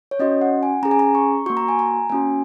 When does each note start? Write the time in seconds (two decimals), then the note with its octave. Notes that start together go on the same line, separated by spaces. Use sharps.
0.11 C#5
0.19 C#4 F#4 D#5
0.41 F#5
0.63 G#5
0.83 C#4 G#4 A#5
0.91 G#5
0.99 A#5
1.15 C#6
1.46 A#3 F#4 C#6
1.57 A#5
1.68 G#5
1.79 A#5
2.10 A#3 C#4 F#4 G#5